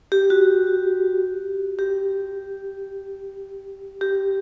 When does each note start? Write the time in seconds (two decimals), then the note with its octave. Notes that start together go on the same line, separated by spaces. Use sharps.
0.12 G4
0.30 F#4
1.79 G4
4.01 G4